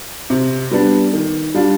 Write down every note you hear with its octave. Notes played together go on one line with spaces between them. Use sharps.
C3
G3 B3 D4
D#3
G3 D4 F4